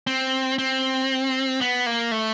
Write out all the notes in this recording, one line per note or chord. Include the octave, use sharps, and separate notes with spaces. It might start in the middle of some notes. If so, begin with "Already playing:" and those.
C4
C4
B3
A#3
A3